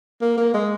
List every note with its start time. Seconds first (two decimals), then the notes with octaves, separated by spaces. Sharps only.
0.21 A#3
0.37 A#3
0.54 G#3